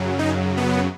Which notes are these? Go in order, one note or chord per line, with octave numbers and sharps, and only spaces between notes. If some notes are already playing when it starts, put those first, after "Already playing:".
Already playing: F#2 C#3 F#3
D#4
B3